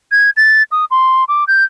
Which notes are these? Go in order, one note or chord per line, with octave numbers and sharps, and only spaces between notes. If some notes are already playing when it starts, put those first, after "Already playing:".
G#6
A6
D#6
C6
D6
G6